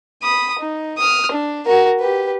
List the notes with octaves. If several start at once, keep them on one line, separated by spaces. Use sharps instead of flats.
B5 D#6
D#4
D#6 F6
D4
F#4 A#4
G4 B4